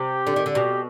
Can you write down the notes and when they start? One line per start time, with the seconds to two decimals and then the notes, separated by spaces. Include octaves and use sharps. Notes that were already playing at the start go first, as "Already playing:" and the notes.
Already playing: C3 G4
0.27 D3
0.36 D#3
0.46 D3
0.55 B2 G4